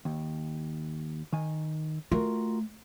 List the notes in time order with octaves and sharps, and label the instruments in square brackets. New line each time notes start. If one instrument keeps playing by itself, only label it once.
[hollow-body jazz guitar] D#2
D#3 G#5
[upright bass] A3 [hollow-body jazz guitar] F4 F#4 A#4